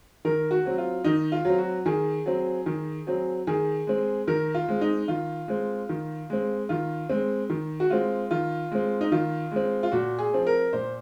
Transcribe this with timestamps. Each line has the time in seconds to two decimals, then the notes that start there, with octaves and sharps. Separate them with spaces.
0.25 D#3 A#4
0.51 F#4
0.65 F#3 C4
0.78 F4
1.04 D#3 D#4
1.32 F4
1.45 F#3 C4
1.58 F#4
1.86 D#3 G#4
2.26 F#3 C4
2.66 D#3
3.07 F#3 C4
3.47 D#3 G#4
3.87 G#3 C4
4.28 D#3 A#4
4.55 F4
4.68 G#3 C4
4.81 D#4
5.08 D#3 F4
5.48 G#3 C4
5.89 D#3
6.30 G#3 C4
6.69 D#3 F4
7.09 G#3 C4
7.50 D#3
7.80 F#4
7.90 G#3 C4 F4
8.31 D#3 F4
8.72 G#3 C4
9.01 D#4
9.12 D#3 F4
9.52 G#3 C4
9.83 F4
9.92 A#2 F#4
10.19 G#4
10.33 F3 C4
10.47 A#4
10.73 A#2 C5